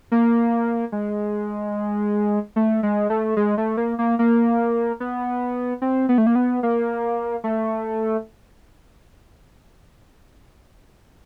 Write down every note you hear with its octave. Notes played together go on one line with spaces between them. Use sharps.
A#3
G#3
A3
G#3
A3
G#3
A3
A#3
A#3
A#3
B3
C4
B3
A3
A#3
B3
A#3
A3